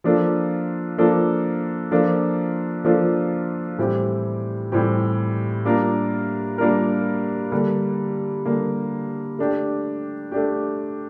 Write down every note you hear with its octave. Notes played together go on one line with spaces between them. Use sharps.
F3 A#3 D4 F4 A4
F3 A#3 D4 F4 A4
F3 A#3 D4 F4 A4
F3 A#3 D4 F4 A4
A2 E3 G3 C4 G4
A2 E3 G3 C4 G4
G3 A#3 D4 F4 A#4
G3 A#3 D4 F4 A#4
D3 G3 A#3
D3 G3 A#3
A3 D4 G4
A3 D4 G4